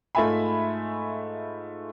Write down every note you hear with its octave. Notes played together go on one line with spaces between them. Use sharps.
G#2 A3 F4 E5 G#5 B5